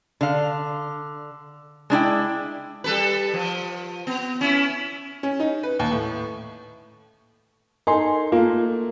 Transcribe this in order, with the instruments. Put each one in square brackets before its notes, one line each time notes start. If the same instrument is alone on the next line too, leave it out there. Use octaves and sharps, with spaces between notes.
[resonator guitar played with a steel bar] D3 F5
G#3 D4 E4 G5
[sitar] G3 A4 B4
F3
B3
C#4 E4
[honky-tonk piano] C#4
D#4
B4
D#2
A2
[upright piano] D#4 A4 [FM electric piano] A#4 G#5 C6
[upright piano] A3 A#3 [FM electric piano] F4